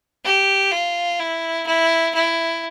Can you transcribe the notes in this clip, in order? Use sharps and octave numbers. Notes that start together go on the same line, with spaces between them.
G4
F4
E4
E4
E4